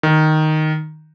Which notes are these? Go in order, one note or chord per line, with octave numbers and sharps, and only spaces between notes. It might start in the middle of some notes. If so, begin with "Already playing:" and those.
D#3